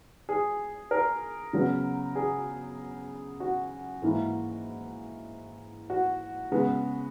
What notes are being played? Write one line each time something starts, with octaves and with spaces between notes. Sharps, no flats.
G#4
A#4
C#3 F#3 B3
G#4
F#4
G#2 E3 A#3
F#4
C#3 G#3 B3